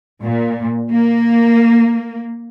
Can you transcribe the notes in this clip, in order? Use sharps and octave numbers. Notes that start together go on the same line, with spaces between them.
A#2
A#3